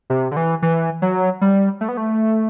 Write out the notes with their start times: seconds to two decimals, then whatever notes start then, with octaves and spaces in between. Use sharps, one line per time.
0.10 C3
0.31 D3
0.37 E3
0.62 E3
1.02 F#3
1.41 G3
1.81 A3
1.89 B3
1.97 A3